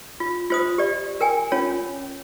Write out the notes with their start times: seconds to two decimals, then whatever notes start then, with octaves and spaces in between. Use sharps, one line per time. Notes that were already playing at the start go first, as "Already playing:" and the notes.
0.20 F4
0.50 F4 C5 D#6
0.78 G4 D5
1.21 A#4 G5 G#5
1.52 C#4 F4 C#5